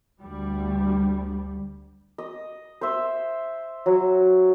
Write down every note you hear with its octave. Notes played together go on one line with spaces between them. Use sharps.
D2 G3
D#5
C5 E5
F#3